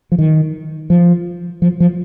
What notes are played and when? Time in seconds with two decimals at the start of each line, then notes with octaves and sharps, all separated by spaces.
0.12 F3
0.19 D#3
0.90 F3
1.62 F3
1.80 F3